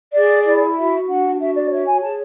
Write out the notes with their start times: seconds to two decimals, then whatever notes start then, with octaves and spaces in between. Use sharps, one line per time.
0.13 G#4 D5
0.46 E4
0.76 F#4 E5
1.08 D4 F#5
1.40 F#4 E5
1.56 D5
1.71 C#5 E5
1.86 G#5
2.02 G#4 A5